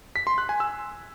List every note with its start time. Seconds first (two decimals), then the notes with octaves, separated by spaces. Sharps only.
0.16 B6
0.27 C6
0.38 F#6
0.49 G#5
0.60 E6